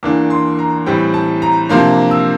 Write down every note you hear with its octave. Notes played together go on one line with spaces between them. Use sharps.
E2 E3 A#3 D4 D6
C6
A#5
A2 E3 G3 C4 G5
A5
A#5
C3 F3 A#3 D4 C6
E6